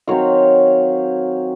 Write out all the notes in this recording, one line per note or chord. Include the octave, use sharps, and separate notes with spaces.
D#3 F#3 C4 C#5 F5